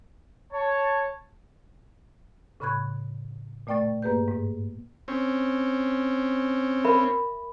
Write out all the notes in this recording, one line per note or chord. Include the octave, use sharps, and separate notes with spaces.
C#5 A5
A2 C#3 B5 C#6 F#6 G#6
A#2 A3 D5 G5 C#6 A6
G2 A#3 G#4 B4 G6
G#2
C4 C#4
A#4 E5 B5